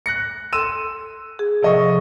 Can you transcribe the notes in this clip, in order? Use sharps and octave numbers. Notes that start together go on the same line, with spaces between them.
F#6 A#6 C#7
A4 C6 E6 D#7 E7
G#4
C3 F3 A4 D#5 C#6